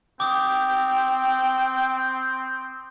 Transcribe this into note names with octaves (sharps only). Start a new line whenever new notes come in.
C4 G5 D6 D#6